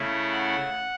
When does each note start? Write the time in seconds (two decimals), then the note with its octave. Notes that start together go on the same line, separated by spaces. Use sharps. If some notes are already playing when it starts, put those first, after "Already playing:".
Already playing: C#3 A3 C#4 E4 E5
0.32 F#5